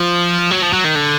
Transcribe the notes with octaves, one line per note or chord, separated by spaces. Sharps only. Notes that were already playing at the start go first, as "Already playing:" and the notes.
Already playing: F3
F#3
F3
F#3
D#3
D3